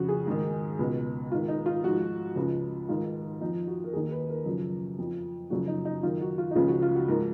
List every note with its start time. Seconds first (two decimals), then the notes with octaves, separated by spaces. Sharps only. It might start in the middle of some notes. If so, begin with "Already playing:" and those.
Already playing: F2 C#3 F3 F#4
0.08 G#4
0.27 G#2 D#3
0.79 C#2 B2
1.31 G#2 D#3 F4
1.48 D#4
1.66 F4
1.84 G#2 F3 F#4
2.36 C#2 C#3 F3
2.89 G#2 D#3 F4
3.41 F2 D#4
3.44 F3
3.67 F#4
3.84 A#4
3.93 D#2 D#3 G#4
4.11 B4
4.29 A#4
4.45 F#2 C#3 F3
4.98 F2 F3
5.50 F#2 C#3 F3 F#4
5.68 D#4
5.85 D#4
6.03 F#2 D#3 F4
6.21 F#4
6.38 F4
6.51 D#4
6.55 C#2 C#3 F3 F4
6.68 F#4
6.82 F4
6.95 F#4
7.08 G#2 F3 A#4